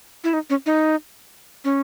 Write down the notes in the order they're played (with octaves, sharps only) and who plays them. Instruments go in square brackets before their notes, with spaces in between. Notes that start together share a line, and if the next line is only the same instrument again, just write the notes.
[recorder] E4
D#4
C#4
D#4
C#4